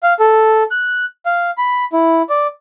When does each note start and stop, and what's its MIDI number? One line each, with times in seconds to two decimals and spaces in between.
0.03 0.13 77
0.19 0.63 69
0.71 1.04 90
1.26 1.51 77
1.58 1.84 83
1.93 2.22 64
2.29 2.47 74